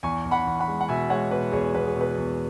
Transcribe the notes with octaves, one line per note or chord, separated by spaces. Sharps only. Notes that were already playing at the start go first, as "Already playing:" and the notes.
E2 G#5 C#6
E2
F#5 B5
E2
F#5 B5
G#3
F#5
B2 E5 G#5
G#3 C#5 F#5
B2 B4
E2 G#4 C#5
E2 B4
G#4
B2
B4
E2